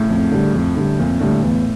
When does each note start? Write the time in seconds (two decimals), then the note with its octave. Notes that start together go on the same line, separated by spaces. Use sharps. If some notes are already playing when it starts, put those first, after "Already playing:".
Already playing: A2 C#3
0.10 F2
0.32 D3 G3
0.54 F2
0.77 D3 G3
0.99 F2 A#2
1.20 A2 D3 G3
1.43 E2 A2